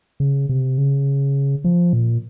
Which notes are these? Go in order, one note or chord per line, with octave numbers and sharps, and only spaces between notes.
C#3
C3
C#3
F3
A#2